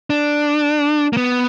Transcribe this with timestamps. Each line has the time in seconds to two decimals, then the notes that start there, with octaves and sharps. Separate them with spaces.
0.10 D4
1.13 A#3
1.17 B3